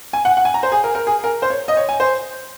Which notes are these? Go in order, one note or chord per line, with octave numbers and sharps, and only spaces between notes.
G#5
F#5
F#5
G#5
A#5
C5
G#4
A#4
A#4
G#4
A#4
C5
C#5
D#5
C#5
G#5
C5